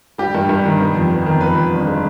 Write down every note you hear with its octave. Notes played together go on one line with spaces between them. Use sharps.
G3 G4
G2
G2
D#3
B3
F2
B3
D#3
F2 B4
F2
G1
G#3